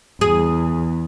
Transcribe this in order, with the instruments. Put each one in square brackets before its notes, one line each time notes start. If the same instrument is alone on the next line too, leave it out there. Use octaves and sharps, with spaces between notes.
[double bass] E2 [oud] G#4